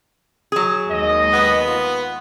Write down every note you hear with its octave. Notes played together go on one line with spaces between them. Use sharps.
F#3 G#4
D#2 G#3 D#5
B3
F4